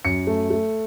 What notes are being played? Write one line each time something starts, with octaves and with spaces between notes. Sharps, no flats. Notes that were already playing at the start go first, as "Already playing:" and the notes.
F#2 C#7
A3
A3